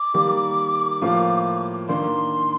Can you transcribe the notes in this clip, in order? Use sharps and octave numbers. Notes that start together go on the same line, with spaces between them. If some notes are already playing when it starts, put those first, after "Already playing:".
Already playing: D6
D#3 G3 A#3
A2 F3 A#3 F4
D#3 A#3 D4 C6